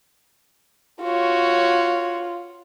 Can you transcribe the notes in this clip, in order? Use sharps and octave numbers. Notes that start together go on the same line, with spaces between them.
F4 F#4 C#5